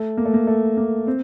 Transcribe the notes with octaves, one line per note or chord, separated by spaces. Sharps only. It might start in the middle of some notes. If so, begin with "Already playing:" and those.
Already playing: A3
A#3
A3
A#3
A3
A#3
C4